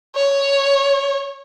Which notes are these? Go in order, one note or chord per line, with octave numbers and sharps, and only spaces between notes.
C#5